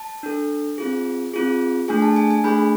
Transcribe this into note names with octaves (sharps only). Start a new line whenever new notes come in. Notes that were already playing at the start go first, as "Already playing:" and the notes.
Already playing: A5
D4 A4
C4 F4 G#4
C4 F4 G#4
A3 D4 G#4 G#5
A5
G#5
G#5
A3 D4 G#4 B5